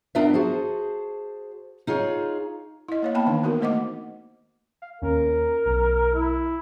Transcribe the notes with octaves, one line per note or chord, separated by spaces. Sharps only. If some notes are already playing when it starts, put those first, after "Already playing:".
B3 D4 F4 A#4 D#5 E5
F#4 G#4 A4 C5
D#4 F4 G#4 C#5
E4 D#5
A#3 C#5 F5
A#3 B3 G5 A5 B5
D#3 E3 D4 D#4
B3 D#4 F#4 A#4
A3 A#3 C5 D#5 F#5 D6
F5
D#2 C#4 A#4
B1
E4